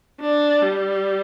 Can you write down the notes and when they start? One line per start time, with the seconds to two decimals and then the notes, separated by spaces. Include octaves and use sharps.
0.21 D4
0.62 G3